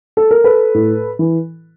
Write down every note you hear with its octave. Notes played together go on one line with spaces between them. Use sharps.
A4
A#4
A4 B4
A2
E3